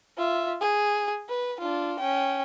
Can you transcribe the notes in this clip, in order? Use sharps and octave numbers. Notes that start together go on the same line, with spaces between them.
F4 E5
G#4
B4
D4 F4
C#4 G5